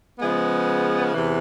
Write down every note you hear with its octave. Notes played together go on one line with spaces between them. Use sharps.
C#3 F3 G#3 B3
E2 C3 E3